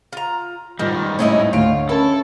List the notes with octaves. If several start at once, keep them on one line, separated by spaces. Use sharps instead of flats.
F4 A#5
G#2 D#3 G3 F4 G6
A2 C#4 D#4 E4 D#5
D2 D3 F4 C#5 D7
C#4 E4 A4 A#4 A5